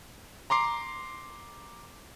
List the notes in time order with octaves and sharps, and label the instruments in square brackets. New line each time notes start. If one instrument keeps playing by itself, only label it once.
[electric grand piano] A#5 C6 D6 C7